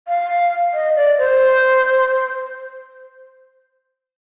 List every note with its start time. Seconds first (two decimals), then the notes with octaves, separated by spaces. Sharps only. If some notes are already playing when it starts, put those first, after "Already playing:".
0.08 F5
0.74 D#5
0.96 D5
1.18 C5